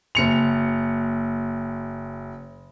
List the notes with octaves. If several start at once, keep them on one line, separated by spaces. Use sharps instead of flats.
F#1 C#7 F7